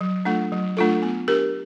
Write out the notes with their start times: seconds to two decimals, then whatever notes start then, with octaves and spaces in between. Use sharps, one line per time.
0.01 F#3
0.25 A3 D4 F4 A4
0.52 F#3
0.77 A3 D4 F4 A4
1.03 B3
1.28 D4 G4 A#4